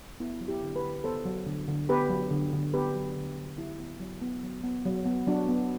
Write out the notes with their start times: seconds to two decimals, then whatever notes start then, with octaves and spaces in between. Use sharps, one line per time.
0.20 B3 E4
0.41 F#3
0.48 E4 G4
0.63 D3
0.76 G4 B4
0.84 D3
1.04 B3 A4 C5
1.25 F#3
1.46 D3
1.68 D3
1.89 B3 G4 B4
2.10 F#3
2.31 D3
2.53 D3
2.74 B3 G4 B4
2.95 F#3
3.16 D3
3.36 D3
3.58 F#3 E4 G4
3.79 B3
4.00 F#3
4.22 B3
4.43 F#3
4.64 B3
4.85 F#3
5.06 B3
5.27 F#3 D4 F#4
5.48 B3